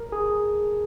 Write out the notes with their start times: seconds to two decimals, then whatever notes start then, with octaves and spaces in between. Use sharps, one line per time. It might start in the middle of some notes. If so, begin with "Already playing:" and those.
Already playing: A#4
0.12 G#4